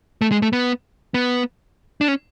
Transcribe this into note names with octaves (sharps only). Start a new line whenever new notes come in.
A3
G#3
A3
B3
B3
D4
C#4